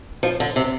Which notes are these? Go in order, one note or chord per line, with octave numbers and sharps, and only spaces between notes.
F3
D3
C3